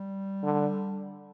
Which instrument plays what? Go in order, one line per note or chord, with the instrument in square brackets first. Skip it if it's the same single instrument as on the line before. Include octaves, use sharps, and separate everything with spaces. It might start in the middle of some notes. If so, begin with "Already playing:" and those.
Already playing: [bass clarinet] G3
[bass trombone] D3